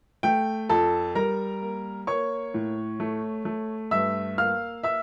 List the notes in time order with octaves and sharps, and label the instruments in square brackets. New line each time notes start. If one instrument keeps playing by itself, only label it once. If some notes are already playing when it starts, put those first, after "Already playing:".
[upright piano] A3 G5
F2 A4 A5
G3 A#4 A#5
A#3
A#3 C#5 C#6
A2
A3
A3
G2 E5 E6
A#3 F5 F6
E5 E6